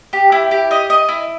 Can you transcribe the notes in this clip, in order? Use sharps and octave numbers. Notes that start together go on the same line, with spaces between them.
G4
E4
G4
D#5
D#5
E4